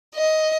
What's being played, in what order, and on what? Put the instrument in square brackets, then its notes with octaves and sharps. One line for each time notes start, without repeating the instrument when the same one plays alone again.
[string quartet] D#5